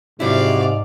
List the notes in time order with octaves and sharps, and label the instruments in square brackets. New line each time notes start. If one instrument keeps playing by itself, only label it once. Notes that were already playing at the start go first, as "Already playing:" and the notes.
[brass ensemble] G#2 [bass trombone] C3 [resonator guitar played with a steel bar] F3 F#3 E4 [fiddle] D5 F5